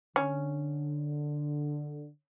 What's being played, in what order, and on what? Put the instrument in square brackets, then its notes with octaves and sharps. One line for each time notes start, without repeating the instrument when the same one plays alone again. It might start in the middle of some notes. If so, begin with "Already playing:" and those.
[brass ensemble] D3 [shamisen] C#4